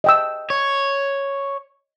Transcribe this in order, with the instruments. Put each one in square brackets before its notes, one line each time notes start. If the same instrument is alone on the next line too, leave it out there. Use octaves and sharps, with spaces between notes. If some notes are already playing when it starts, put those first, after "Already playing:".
[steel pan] D#5 G5 E6
[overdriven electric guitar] C#5